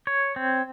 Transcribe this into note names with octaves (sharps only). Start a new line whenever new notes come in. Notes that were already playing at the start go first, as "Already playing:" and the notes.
C#5
C4